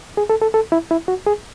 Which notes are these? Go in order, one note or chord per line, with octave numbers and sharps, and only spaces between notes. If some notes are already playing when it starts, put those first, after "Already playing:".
G#4
A4
A4
A4
E4
E4
F#4
G#4